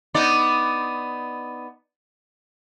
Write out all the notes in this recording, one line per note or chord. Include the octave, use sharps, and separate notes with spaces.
B3 D#4 D5